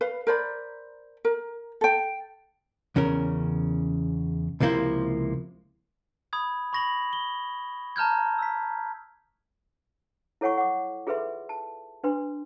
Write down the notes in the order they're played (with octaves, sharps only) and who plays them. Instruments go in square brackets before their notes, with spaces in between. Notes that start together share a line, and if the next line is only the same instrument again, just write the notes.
[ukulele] B4 F5
A#4 C5 D5 B5
A#4
A4 G5
[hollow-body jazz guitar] E2 C#3 C#4 A#4
C#2 C3 F3 A#3 E4 C5
[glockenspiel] B5 D#6 G#6
B5 C#6 A#6 F7 F#7
G7
A5 A#5 F6 G6 G#6
E6 B6
[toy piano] E4 A4 C#5 F#5 G#5 C#6
F#5 D6
F4 G#4 A4 B4 E5 C6
A5
D4 B4 C6